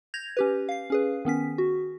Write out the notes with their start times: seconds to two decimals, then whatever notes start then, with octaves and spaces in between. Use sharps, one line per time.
0.14 G6 G#6 A#6 F7
0.37 C#4 G4 B4
0.69 F5 C7
0.90 C#4 G#4 B4
1.25 D#3 B3 C#4 B6
1.58 F#4